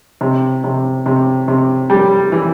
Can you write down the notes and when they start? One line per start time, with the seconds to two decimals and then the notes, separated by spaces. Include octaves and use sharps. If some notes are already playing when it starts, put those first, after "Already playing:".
0.21 C3
0.64 C3
1.06 C3
1.48 C3
1.90 G3
2.32 E3